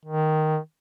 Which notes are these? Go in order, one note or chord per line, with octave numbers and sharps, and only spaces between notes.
D#3